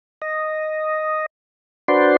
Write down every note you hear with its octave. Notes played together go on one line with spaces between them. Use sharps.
D#5
D4 F#4 B4 C5 D5 C6